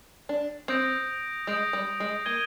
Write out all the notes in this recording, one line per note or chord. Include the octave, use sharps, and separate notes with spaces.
D4
C4 D#6 G6 A#6 D7
G#3 D#6 G6 A#6 D7
G3
G#3
A#3 G#6 D#7 G7